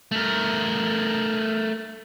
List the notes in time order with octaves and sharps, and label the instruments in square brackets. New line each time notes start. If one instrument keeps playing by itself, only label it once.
[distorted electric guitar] A3 A#4